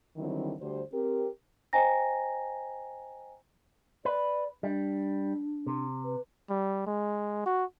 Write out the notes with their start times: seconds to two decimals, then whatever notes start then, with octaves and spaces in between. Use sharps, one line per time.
0.16 D3 D#3 F#3 G3 C4 E4
0.60 D2 G3 C5
0.92 C4 G4 A#4
1.73 C5 D#5 G5 G#5 A#5 A#6
4.05 B4 D5
4.63 G3 D4
5.67 C3
6.04 B4
6.50 G3
6.86 G#3
7.46 F#4